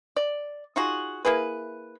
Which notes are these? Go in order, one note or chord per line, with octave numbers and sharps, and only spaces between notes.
D5
D#4 F4 F#4 G#4
A#3 E4 G#4 B4